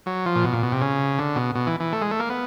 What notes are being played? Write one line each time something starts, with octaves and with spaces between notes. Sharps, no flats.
F#3
F3
A#2
B2
A#2
B2
C3
C#3
D3
B2
B2
E3
E3
A3
G#3
A3
A#3
B3